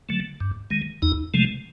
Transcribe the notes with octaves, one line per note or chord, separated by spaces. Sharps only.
D3 F#3 A3
G2
D#3 G#3
E2 D#4
C3 F3 G#3 A3